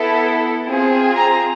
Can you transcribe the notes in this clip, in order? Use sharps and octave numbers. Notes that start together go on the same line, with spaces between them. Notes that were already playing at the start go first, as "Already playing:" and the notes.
Already playing: B3 E4 A4
C4 F4 G#4
A#5